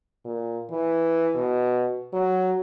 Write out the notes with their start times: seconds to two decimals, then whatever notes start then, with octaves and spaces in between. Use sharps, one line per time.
0.25 A#2
0.71 E3
1.35 B2
2.13 F#3